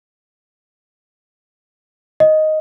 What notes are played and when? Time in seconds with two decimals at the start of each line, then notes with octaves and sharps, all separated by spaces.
2.20 D#5